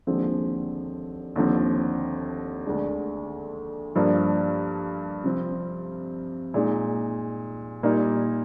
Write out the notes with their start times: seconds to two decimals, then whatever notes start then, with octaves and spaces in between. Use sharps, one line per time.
0.07 D#2 D3 F3 G#3 C4
1.36 D#2 D3 F3 C4
2.66 D2 D3 G#3 D4
3.95 G2 F3 A#3 D4
5.24 C3 F3 C4
6.54 A#2 G#3 D#4
7.83 A#2 G3 A#3 D#4